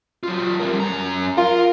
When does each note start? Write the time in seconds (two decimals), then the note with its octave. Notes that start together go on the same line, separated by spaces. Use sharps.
0.23 F#3 F4
0.60 G3 A#4
0.80 F#2 A#5
1.37 F4 A#4